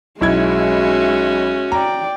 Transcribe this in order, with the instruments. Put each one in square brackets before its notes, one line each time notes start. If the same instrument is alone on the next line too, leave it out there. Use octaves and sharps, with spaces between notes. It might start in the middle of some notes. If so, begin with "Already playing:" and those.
[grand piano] B1 E4 G#6 [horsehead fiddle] G#3 E5 [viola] C#4 F#4
[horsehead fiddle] D5 G5 [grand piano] A#5